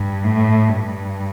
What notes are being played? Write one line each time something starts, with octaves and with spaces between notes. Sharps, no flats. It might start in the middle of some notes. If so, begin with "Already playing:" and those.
Already playing: G2
A2
G2